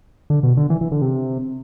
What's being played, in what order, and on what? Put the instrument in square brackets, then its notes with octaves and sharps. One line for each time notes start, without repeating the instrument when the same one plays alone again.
[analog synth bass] D3
B2
D3
E3
E3
D3
C3